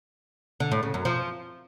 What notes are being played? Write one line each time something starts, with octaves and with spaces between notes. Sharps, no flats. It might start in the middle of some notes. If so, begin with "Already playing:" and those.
D3
A2
C#3
F#2
F3